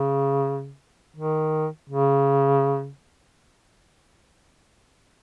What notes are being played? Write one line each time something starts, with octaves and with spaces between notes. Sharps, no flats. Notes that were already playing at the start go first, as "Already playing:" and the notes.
Already playing: C#3
D#3
C#3